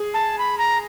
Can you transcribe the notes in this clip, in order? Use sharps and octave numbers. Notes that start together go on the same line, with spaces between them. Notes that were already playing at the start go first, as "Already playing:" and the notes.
Already playing: G#4
A5
B5
A#5